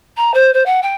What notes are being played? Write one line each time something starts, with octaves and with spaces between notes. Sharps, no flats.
A#5
C5
C5
F#5
G5